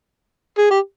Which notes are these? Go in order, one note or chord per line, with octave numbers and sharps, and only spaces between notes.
G#4
G4